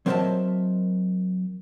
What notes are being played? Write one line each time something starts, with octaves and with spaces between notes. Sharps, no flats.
F#3 C4 A#4 D#5 E5 A5